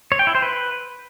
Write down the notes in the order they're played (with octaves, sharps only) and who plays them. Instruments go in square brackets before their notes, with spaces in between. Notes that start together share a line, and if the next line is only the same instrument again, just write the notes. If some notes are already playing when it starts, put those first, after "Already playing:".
[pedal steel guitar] C#5
G5
E4
C5
B4